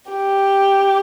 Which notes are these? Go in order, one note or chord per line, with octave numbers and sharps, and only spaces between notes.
G4